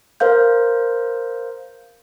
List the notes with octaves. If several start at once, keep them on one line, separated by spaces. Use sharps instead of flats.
A#4 C5 F5 G6